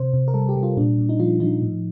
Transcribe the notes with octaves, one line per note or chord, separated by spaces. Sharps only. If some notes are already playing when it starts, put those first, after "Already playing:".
Already playing: C3 C5
C3
A#4
G3 A4
G4
G3
F4
A#2 D4
A#2
D#4
F3 F4
F3 D#4
A2